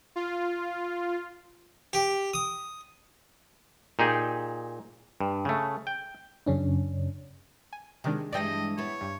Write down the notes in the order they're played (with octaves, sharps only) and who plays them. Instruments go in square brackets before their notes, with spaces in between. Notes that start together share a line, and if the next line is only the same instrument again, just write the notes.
[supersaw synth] F4
[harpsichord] G4
D#6
[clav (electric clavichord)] A#2 D#4 G4 G#4
G2
C#3 A3
G5
[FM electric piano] F#2 C#3 C#4 D4
[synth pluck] G#5
[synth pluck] C3 D#3 D4 [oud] G#3
[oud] G2 E3 G#3 [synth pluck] D5 G5 A#6 [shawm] D#5
[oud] B3 E4 [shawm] C#5
[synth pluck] G2